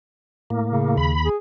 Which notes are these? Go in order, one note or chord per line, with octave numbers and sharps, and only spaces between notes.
A2 A#3
C#3
D#2 B5
G#4